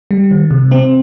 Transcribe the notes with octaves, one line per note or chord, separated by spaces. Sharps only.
G3
D#3
C3
C4